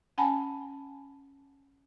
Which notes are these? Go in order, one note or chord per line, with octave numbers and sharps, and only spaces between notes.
C#4 F#5 G#5 A5 B5